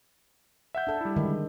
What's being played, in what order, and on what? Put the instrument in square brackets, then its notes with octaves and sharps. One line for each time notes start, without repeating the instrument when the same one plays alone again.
[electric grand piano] E5 F#5 G6
[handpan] D4 A4
[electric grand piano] G3 E4
[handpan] D3 D#3 G#3